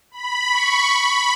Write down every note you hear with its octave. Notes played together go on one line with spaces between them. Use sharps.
B5
C#6
B5